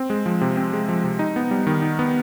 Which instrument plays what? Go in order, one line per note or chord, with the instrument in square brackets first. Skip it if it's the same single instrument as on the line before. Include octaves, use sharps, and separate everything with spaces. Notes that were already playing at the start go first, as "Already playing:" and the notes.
Already playing: [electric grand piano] C4
G#3
F3
C3
C4
G#3
F3
C3
D#4
B3
G3
D#3
D#4
B3